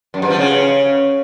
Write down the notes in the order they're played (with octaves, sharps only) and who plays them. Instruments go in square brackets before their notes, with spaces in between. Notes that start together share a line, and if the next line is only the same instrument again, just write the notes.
[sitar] F#2
G2
F3
C#3